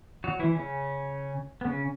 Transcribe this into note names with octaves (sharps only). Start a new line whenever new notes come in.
F#3 F#4
E3 E4
C#3 C#4
B3
C#3 C#4